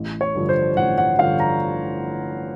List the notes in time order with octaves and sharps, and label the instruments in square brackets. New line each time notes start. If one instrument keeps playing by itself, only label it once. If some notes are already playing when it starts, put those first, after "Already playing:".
Already playing: [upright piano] A1
C#5
G2 D3 F3
C5
A1 F#5
F#5
G2 D3 F3 F5
A#5